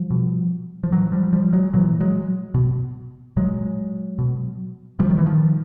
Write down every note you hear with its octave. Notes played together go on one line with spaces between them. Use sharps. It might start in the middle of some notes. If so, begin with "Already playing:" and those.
Already playing: F3 G3
B2
F3
A2 E3 F#3
F3 G3
F3 G3
F#3 G#3
A#2 E3 F#3
F#3 G#3
B2
A#2 F#3 G#3
B2
A#2 F3 G3
D#3
E3
D#3 F3